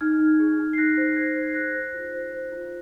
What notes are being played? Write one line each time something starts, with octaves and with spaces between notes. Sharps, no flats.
D#4 F6 G#6
D#4
G#4
D#4
C7
D#4 F#6 A#6
C5
A#6
C5 G#6 C7
C5
C7
G#4 F#6 A#6
C5
F4
C5
C5
F4